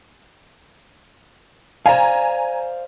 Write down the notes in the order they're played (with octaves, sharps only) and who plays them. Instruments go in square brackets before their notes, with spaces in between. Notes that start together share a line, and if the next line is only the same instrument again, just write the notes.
[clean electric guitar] C5 D5 F5 [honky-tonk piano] G#5 A#5